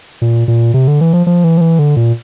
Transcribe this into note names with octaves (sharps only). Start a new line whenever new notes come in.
A#2
A#2
C3
D3
E3
F3
F3
E3
F3
E3
D3
A#2